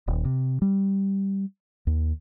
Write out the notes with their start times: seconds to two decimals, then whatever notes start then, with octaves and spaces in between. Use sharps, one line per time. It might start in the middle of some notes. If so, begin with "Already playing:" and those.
0.07 D#1
0.25 C3
0.62 G3
1.87 D#2